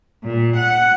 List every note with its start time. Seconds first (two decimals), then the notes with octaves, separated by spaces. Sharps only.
0.23 A#2
0.57 F#5